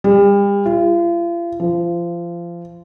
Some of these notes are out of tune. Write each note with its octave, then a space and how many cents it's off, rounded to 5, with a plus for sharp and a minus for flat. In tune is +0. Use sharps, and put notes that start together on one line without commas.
G3 +40
F4 -40
F3 -25